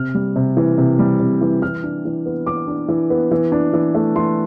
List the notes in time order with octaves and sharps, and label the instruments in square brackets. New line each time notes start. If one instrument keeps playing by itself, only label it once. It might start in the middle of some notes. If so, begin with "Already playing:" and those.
Already playing: [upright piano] C3 F6
G3
C3
E3
C3
G3
C3
E3
E3 F6
D4
E3
B3
E3 D6
D4
E3
B3
E3
D4
E3
A3
E3 C6